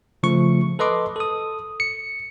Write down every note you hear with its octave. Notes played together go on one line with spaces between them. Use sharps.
C#3 F3 A3 C#6
A4 B4 D#5 C6 D6
A4 D#6
C#7